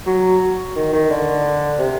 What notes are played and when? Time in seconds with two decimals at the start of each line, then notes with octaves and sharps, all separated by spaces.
0.06 F#3
0.76 D#3
0.93 D#3
1.10 D3
1.78 C3